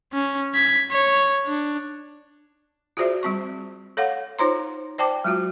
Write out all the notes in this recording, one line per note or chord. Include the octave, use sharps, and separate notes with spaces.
C#4
G#6 B6
C#5
D4
F4 F#4 G#4 C5 D5 E5
G3 C4 C#6
A4 C#5 F5 F#5
D#4 F4 C5 C#5 A#5 C6
C5 D5 G5 A5 D6
F#3 G#3 F4 F#4